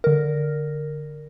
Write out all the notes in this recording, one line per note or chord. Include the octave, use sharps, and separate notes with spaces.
D3 A#4